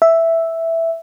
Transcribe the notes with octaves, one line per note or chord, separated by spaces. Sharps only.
E5